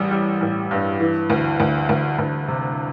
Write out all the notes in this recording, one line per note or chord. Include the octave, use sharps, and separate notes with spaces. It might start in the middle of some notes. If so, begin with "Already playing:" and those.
Already playing: A1 E3 G3
G3
A1
G2
E3
D2
D2
D2
D2
C3